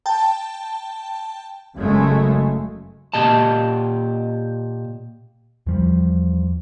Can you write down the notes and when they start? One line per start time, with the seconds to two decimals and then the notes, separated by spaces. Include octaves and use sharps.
0.06 G5 A5
1.76 F#1 F#2 C#3 G#3 A3
3.14 A#2 G4 D#5 A5
5.66 E2 F3 G3